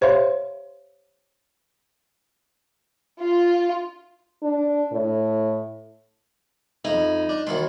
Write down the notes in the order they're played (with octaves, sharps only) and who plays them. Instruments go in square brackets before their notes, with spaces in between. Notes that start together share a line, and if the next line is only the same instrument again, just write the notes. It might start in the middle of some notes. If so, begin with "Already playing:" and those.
[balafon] G4 C5 C#5 E5 F5 C6
[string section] F4
[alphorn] D4
A2
[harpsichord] F2 E4 [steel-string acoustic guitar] D#4
[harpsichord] D4
[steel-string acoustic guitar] D#2 F#4 [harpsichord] D#3 E4 C6